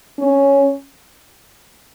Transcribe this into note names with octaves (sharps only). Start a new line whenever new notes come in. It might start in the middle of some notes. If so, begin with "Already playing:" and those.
C#4